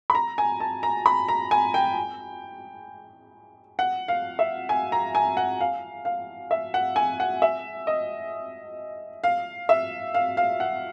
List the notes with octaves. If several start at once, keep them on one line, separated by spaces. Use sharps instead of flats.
B5
A#5
G#5
A5
A#5
B5
A#5
G#5
G5
F#5
F5
E5
G#5
A#5
G#5
F#5
F5
F5
E5
F#5
G#5
F#5
E5
D#5
F5
E5
F5
F5
F#5